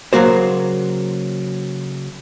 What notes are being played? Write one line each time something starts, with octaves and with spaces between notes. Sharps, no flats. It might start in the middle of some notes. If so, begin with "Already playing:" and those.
C#3 F3 F#3 A#3 F#4 C5